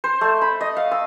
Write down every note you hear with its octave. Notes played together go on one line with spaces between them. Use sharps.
C5
A3
B5
D#5
F5
E6